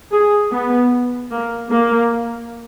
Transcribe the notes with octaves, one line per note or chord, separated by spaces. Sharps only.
G#4
B3
A#3
A#3